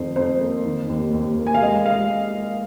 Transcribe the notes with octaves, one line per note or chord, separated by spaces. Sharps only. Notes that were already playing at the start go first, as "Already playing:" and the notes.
Already playing: F2 D#3 C5
F2 C5
A#3
D#3
D#2
D#2
A#3
G#5
F5
G#3 D#5
G#3 F5